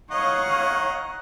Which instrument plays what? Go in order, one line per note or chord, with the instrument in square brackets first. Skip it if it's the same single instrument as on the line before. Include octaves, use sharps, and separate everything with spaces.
[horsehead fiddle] C#5 F5 [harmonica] D#5 F#5 A#5